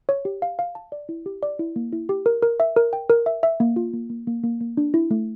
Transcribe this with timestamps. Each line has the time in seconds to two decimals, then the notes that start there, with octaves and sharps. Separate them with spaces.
0.09 C#5
0.25 G4
0.42 F5
0.59 F5
0.75 A5
0.92 D5
1.09 E4
1.26 G4
1.43 D5
1.59 E4
1.76 A#3
1.93 E4
2.09 G4
2.26 A#4
2.43 A#4
2.60 E5
2.76 A#4
2.93 G5
3.10 A#4
3.26 E5
3.43 E5
3.60 A#3
3.76 F4
3.94 A#3
4.10 A#3
4.27 A#3
4.44 A#3
4.61 A#3
4.77 D4
4.94 E4
5.11 A3